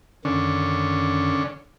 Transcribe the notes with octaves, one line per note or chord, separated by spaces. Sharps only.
F#2 D3 D#3 C#4